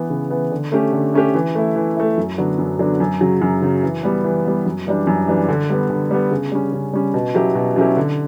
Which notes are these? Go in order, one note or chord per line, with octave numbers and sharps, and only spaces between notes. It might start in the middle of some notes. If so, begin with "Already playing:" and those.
Already playing: E3 B3
C#3
E3 B3
D3
A3 C#4 G4
D3
A3 C#4 G4
E3
A3 E4
E3
A3 E4
F#2
D3 F#3 B3 D4
F#2
D3 F#3 B3 D4
F#2
C#3 F#3
F#2
C#3 F#3
E3
G3 B3
E3
G3 B3
F#2
E3 G3 D4
F#2
E3 G3 D4
D3
G3 B3
D3
G3 B3
C#3
G3 C#4
C#3
G3 C#4
B2
F#3 C#4 E4 G4
B2
F#3 C#4 E4 G4
D3